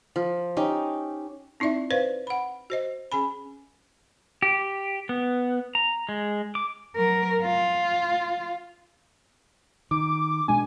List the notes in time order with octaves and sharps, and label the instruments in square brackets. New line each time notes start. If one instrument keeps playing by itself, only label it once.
[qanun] F3
C#4 D#4 G4
[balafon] C4 D#4 E4 D5 E5
B4 C5 D5 F5
F#5 B5
F#4 C5 D#5
C#4 G#4 G#5 B5
[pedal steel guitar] G4
B3
A#5
G#3
D6
[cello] F#3 A#4
F4
[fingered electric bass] D#3 [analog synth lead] D6
[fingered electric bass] B2 G#3 D4 [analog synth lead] G#5